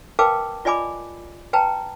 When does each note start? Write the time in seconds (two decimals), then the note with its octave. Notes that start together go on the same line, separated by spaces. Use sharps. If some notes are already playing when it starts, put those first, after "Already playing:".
0.19 A#4 B4 F5 G5 A5 D6
0.65 F4 D5 D#5 G#5 B5 D6
1.53 B4 G5 A5 A#5